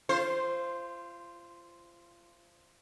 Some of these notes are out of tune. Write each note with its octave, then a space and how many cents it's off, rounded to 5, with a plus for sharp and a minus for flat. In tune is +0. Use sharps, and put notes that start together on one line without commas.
F4 -25 C5 +0